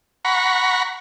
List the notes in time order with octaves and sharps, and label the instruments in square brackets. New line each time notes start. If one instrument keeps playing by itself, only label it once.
[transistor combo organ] F#5 A#5 B5 C#6